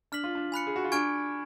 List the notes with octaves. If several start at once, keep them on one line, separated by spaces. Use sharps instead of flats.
D4 F6 B6 F#7
F4
D4
G#5 B5 F#6 C#7
G#4
F#4
F4
D4 G#5 C#6 F6 G#6 D7